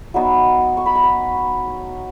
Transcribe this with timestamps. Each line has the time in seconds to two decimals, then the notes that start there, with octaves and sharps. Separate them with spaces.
0.14 F#3 B3 D#4 E5
0.77 C#6
0.86 B5
0.95 A#5
1.03 B5